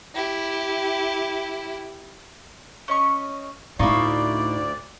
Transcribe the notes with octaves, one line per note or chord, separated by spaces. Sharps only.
E4 G4
C#4 D#5 C#6
D2 A2 D#4 E4 D5 F5 C#6 D#6